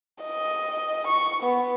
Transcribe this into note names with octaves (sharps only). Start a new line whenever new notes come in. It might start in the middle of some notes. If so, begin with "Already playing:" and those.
D#5
C#6
B3